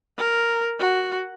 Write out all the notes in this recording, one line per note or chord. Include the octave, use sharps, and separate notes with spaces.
A#4
F#4